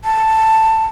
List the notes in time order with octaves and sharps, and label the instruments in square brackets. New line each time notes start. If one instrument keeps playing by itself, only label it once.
[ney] A5